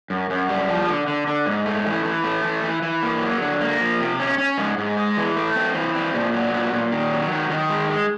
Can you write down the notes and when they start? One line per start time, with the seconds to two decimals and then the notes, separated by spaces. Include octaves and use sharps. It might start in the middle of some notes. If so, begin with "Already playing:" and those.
0.10 F#2
0.30 F#2
0.49 G3
0.69 F3
0.88 D3
1.08 D3
1.27 D3
1.46 G#2
1.66 A3
1.86 E3
2.05 E3
2.24 A3
2.44 E3
2.63 E3
2.82 E3
3.03 A#3
3.22 F#3
3.41 D3
3.61 A#3
3.81 F3
4.00 C3
4.20 C#4
4.38 C#4
4.58 G#2
4.78 G#2
4.97 G#3
5.17 E3
5.36 A3
5.56 C4
5.75 E3
5.95 C4
6.14 A#2
6.34 F#3
6.53 A#2
6.73 A#2
6.92 D#3
7.11 F#3
7.31 D#3
7.50 D#3
7.70 G#3
7.90 G#3